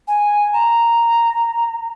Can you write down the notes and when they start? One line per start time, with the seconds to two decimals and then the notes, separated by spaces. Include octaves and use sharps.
0.08 G#5
0.53 A#5